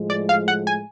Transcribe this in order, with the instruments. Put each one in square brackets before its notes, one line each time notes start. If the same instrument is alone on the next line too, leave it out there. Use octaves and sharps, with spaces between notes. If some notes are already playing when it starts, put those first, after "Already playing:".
Already playing: [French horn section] A2 F3 G#3
[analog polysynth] D5
F5
F#5
G#5